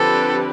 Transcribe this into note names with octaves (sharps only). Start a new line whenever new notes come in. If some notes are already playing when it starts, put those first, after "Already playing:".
Already playing: D3 F3 C4 G4 A4 B4